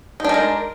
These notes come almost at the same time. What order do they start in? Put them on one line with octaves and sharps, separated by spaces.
D#4 D4 G#3 A#4